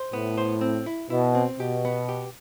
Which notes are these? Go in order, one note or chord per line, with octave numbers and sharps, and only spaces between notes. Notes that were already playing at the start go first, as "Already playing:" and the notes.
Already playing: C5
A2 B3
C5
C4
E4
B2 E4
C4
B2 G4
B3
G4